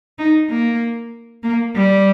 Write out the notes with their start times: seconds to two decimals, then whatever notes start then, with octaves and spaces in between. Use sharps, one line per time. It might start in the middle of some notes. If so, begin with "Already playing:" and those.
0.19 D#4
0.50 A#3
1.43 A#3
1.75 G3